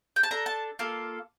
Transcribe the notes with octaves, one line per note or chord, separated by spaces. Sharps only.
G5
A5
D4 A4 A#5
A5
A#3 F4 A4